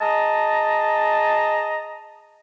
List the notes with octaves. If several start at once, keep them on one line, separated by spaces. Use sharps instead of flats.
G#4 D#5 A5 A#5